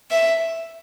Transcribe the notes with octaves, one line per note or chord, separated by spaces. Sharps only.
E5